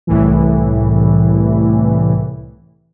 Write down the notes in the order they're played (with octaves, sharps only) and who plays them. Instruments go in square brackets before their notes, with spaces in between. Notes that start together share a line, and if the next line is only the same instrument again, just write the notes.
[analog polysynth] C2 A2 E3